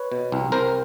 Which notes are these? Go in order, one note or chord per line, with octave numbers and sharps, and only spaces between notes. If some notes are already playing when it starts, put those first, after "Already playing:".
Already playing: B4 C#5
B2
C2
C2 A#4 C5